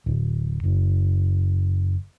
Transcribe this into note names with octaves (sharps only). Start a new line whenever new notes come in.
D1
F#1